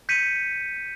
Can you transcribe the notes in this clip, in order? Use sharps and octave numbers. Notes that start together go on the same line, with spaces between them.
G6 B6 C#7 D#7